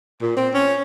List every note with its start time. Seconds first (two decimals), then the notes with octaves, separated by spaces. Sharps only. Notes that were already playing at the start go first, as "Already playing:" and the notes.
0.22 A#2
0.37 C4
0.54 C#4